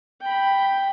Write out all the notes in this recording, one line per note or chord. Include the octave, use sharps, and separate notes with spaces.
G5 B5